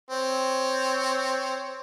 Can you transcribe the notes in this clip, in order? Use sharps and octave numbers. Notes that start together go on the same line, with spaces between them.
C4 C#5